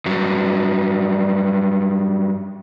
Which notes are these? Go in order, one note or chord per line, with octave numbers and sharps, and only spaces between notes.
G2 F#3